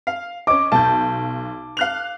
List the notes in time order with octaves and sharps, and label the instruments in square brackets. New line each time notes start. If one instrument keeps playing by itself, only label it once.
[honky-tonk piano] F5
[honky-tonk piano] C#4 D#5 [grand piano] D6
[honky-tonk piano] B1 G6 [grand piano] A5
[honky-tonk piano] F5 F#6 F7